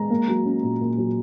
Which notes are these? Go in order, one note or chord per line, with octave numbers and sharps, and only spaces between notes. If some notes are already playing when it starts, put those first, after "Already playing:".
Already playing: G#3 A#5
A#3
F#3
C#4
A#2
A#3
F#3